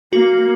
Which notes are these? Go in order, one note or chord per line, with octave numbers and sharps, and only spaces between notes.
A#3 F#4